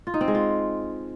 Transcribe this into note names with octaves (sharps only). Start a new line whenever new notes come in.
F4
D#4
C4
G#3
F4